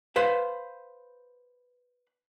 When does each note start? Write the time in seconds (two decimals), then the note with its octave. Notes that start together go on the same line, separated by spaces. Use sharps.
0.16 B4 C5 F5